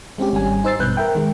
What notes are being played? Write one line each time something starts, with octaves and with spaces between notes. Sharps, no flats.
G#3 C4 C#4 G4
G#1 G3 C#4 G#5
D#4 C5 E6 A6 C7
A1 G2 B2 B4 F#6 G6
A#4 E5 G5
D#3 G#3